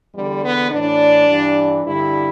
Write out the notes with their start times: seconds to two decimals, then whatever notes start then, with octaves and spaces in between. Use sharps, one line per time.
0.15 E2 D3 G3
0.43 B3
0.71 A2 E3 D4
1.27 G2 E3
1.84 G2 D3 E4